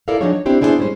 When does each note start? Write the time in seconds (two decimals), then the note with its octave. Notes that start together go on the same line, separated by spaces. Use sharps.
0.08 E4 A4 A#4 D5 E5 F5
0.21 F3 F#3 D4 D#4 G#4 C#5
0.33 C#5
0.46 C4 D4 E4 G4 C5
0.61 B3 D4 E4 G#4 A4 C5
0.79 G3 G#3 C#4 C5